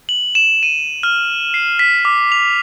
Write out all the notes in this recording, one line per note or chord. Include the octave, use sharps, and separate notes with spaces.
F#7
E7
D#7
F6
C7
B6
D6
F7